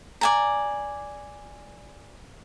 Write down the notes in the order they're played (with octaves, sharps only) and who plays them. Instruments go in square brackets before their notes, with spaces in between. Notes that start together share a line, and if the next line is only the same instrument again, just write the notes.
[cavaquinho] D5 G#5 A#5